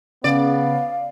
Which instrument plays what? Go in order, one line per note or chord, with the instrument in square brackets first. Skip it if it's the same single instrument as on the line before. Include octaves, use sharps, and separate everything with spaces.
[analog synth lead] C#3 [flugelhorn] B3 [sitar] D5 [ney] F5